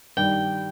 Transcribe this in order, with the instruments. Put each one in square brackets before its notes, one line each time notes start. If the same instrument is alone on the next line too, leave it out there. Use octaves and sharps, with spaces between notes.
[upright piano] G2 D#3 G3 [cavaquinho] G5